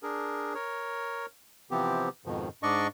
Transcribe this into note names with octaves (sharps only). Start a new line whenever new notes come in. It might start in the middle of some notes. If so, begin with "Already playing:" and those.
D4 G#4 A#4
A#4 C#5
C3 E3 F3 B3 C4 G4
F2 G#2 B2 D#3 F3
G#2 D4 D5 D#5 C#6